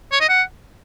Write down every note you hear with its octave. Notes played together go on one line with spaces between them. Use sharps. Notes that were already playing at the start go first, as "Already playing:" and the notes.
C#5
D#5
F#5